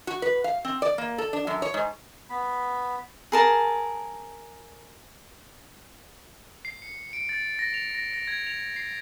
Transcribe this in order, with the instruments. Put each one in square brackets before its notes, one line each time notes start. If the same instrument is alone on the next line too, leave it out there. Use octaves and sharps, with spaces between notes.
[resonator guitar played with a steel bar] F#4
B4
F5
C4
D5
A#3
A4
D4
F#2
C#5
G#2
[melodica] B3 B5
[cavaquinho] G#4 A#4 A5
[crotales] C7
C#7
D7
A6
A#6
F7
A#6
A#6
G#6
F7
C7